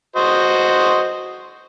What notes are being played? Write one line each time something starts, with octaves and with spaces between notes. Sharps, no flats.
F#4 C5 D#5